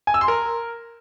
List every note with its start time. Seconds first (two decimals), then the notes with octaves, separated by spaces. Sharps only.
0.07 G#5
0.14 E6
0.21 C6
0.28 A#4